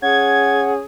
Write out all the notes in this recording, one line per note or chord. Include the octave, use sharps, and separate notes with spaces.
C#4 G#4 F#5 G#6